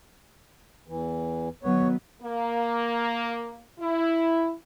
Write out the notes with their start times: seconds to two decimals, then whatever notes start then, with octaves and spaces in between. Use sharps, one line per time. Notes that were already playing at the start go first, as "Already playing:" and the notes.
0.88 E2 E3
1.63 D#3 F#3 B3 C#5
2.22 A#3
3.80 E4